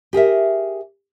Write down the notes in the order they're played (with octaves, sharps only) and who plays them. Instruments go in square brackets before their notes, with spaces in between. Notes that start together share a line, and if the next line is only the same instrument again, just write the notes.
[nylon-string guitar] G4 G#4 A#4 E5